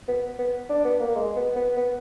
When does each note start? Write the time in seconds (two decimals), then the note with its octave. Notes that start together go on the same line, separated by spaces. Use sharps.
0.08 B3
0.39 B3
0.70 D4
0.84 B3
1.01 A#3
1.16 G#3
1.36 B3
1.56 B3
1.77 B3